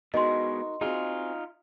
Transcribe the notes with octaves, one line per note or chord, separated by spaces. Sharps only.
B2 G#3 D#4 F#4 A#4 D#5 C6
C4 D#4 F4 F#4 G#4